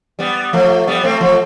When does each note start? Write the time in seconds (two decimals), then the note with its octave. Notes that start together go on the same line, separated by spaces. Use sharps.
0.19 G3 B3
0.53 F3 A3
0.87 G3 B3
1.04 A3 C4
1.21 F3 A3